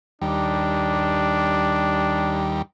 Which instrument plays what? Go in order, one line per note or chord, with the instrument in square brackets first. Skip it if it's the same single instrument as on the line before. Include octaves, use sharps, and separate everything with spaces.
[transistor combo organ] D#2 G3 [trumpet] D4